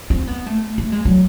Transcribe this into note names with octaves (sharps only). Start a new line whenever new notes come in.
C4
B3
A3
A3
G#3
F#3